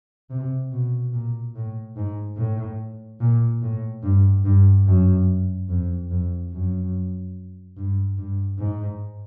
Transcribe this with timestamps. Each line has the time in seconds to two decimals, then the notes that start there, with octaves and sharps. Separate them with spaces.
0.30 C3
0.72 B2
1.13 A#2
1.55 A2
1.96 G#2
2.37 A2
3.20 A#2
3.62 A2
4.03 G2
4.45 G2
4.86 F#2
5.69 F2
6.11 F2
6.51 F#2
7.77 G2
8.18 G2
8.59 G#2